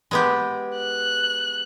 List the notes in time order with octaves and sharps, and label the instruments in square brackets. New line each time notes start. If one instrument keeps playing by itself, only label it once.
[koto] G#3 B3 G4
[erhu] F#6